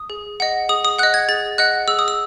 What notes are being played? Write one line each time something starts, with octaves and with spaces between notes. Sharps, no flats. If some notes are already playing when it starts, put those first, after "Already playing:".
Already playing: D#6
G#4
D#5 F#5
G#4 D#6
D#6
D#5 F#5 F#6
G#6
G#4 A6
D#5 F#5 F#6
G#4 E6
D#6
E6